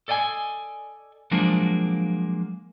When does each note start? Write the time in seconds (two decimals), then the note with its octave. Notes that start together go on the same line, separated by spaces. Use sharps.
0.08 A4 D5 D#5 G5 G#5
1.31 F3 F#3 G#3 A#3 D4